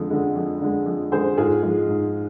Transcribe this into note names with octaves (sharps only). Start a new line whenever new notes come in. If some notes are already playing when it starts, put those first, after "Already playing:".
Already playing: F2 D3 G#3
D3 G#3
F2
D3 G#3
F2
D3 G#3 G#4 C5
G#2 F4 G#4
F3 G#3
G#2